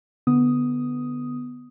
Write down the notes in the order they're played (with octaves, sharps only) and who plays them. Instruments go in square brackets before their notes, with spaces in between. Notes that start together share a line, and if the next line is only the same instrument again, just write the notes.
[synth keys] D3 B3 D#6